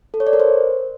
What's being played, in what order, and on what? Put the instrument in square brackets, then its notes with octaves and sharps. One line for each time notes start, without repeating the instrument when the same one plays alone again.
[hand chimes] A4
C#5
D5
A#4
C5